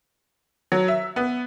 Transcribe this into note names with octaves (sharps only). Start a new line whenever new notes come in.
F#3
E5
B3